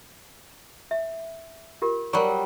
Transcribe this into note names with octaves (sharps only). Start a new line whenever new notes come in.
E5
F4 G4 A#4
F#3 G3 A#4 C5 C#6